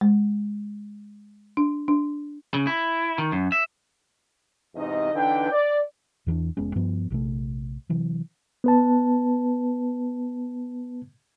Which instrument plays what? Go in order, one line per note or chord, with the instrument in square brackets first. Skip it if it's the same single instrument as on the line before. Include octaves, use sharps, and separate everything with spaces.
[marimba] G#3
D4
D4
[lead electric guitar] C#3
E4
D#3
F#2
E5
[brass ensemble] E2 G#2 C3 D#4 D#5
D3 E3 D4 D#4 B4 G5
D5
[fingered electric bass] E2 E3 G#3 D4
F1 G#3 B3 C#4
G2 F3 B3
A#1 C3 F3 A3
C3 E3 F#3
[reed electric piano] B3 B4 A5